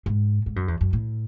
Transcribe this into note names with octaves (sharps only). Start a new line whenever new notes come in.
G#2
G#2
F#2
E2
F#2
A2